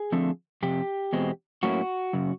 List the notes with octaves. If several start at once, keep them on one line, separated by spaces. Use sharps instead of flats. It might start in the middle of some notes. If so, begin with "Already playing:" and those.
Already playing: G#4
D3 F3 A3 C4
F2 C3 G4
E2 B2 G#3 C4
A2 F#3 A#3 C#4 E4 F#4
F#2 C#3